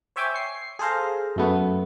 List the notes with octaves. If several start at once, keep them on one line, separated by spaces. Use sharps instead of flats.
C5 C#5 E5 G5 G#5 D6
C#6 C7
G#4 A4 C5 F5 A#5
F#2 A3 B3